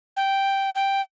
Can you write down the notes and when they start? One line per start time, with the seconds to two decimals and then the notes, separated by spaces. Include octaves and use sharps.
0.17 G5
0.75 G5